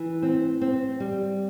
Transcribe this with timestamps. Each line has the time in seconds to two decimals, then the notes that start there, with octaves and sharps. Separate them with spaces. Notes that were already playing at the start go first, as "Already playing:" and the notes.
Already playing: E3
0.22 C4
0.61 C4
1.00 G3